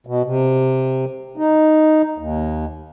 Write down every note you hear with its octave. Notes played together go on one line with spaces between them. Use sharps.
B2
C3
D#4
D#2